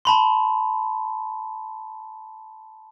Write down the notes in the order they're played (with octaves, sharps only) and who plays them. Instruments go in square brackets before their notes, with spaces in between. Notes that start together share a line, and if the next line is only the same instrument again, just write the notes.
[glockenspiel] A5 B5 C6